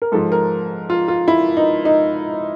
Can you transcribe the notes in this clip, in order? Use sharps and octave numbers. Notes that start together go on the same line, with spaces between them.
A#4
G#2 F3 A4
A#4
F4
F4
E4
D#4
D#4